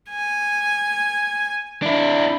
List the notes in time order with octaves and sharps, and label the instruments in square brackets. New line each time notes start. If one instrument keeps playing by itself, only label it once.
[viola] G#5
[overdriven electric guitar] D4 E4